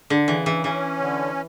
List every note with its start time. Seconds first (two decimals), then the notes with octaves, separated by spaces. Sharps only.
0.10 D3
0.28 C#3 E3
0.46 E3
0.64 E3 C#4
0.99 D3